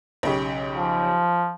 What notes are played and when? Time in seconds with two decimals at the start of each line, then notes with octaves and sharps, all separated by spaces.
0.23 B1 C#3 G4
0.75 F3